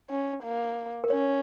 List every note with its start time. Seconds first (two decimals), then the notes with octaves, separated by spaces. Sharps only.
0.10 C#4
0.43 A#3
1.04 A#4
1.10 C#4 C#5